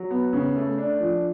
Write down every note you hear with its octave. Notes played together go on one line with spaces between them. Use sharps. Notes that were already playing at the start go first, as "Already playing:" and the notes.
Already playing: F#3
B3
C#3
A3
D4
F3